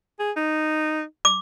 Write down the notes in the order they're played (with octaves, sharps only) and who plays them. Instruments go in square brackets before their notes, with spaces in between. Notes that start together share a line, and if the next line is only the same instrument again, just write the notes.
[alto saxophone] G#4
D#4
[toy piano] D6